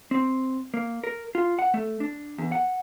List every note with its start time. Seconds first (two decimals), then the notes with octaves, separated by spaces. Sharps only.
0.11 C4
0.74 A#3
1.04 A#4
1.35 F4
1.59 F#5
1.74 A3
2.00 D4
2.38 E2
2.52 F#5